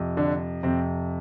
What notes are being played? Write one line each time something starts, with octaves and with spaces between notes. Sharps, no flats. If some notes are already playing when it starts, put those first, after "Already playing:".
Already playing: F2 C3 F3
D3 D4
F2 C3 F3 C4